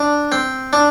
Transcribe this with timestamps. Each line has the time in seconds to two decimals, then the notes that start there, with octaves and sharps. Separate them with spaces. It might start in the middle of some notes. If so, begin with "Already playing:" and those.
Already playing: D4
0.32 C4
0.73 D4